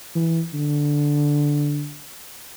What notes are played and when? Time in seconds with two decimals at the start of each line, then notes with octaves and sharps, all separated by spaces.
0.15 E3
0.54 D3